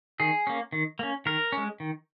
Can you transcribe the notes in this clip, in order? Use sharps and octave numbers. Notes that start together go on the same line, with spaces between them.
D#3 G#4
A#3 C#4
D#3
A#3 C#4
D#3 A#4
G#3 C#4
D#3